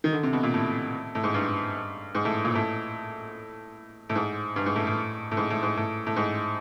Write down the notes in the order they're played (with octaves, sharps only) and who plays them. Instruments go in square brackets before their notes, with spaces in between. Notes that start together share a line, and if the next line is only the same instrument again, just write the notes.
[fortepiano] D#3
D3
C3
B2
A#2
A2
A2
G#2
G2
G#2
A2
A#2
A2
A2
G#2
G2
G#2
A2
A2
A2
G#2
A2
G#2
A2
A2
G#2